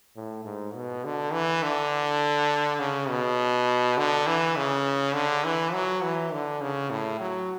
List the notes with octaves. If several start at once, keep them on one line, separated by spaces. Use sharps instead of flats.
A2
G#2
B2
D3
E3
D3
C#3
B2
D3
E3
C#3
D3
E3
F#3
E3
D3
C#3
A2
F#3